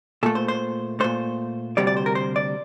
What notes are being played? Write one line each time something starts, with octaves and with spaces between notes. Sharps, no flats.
A#2 A3 A4
C5
C5
A#2 A3 C5
D2 C3 G3 D5
D5
C5
A#4
C5
D5